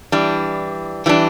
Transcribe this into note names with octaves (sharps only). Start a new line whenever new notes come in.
E3 G3 D4
E3 G3 D4